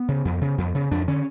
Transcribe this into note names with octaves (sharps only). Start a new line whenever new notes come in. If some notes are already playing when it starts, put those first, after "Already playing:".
Already playing: B3
C#3
F2
C#3
F2
C#3
F2 D4
D3 C#4